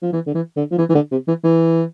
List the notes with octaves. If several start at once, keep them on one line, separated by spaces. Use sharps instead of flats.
F3
E3
D3
E3
D3
F3
E3
E3
D3
C3
E3
E3